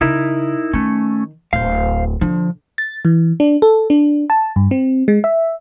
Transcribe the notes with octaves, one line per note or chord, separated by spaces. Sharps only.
C#3 D#4 E4 A#4
D#3 A3 C#4
D1 C5 F5
D3 F3
A6
E3
D4
A4
D4
A5
G2
C4
G#3
E5